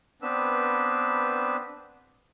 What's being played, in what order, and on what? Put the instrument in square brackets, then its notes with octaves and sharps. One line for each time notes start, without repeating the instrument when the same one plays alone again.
[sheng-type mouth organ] B3 C4 D4 B4 E6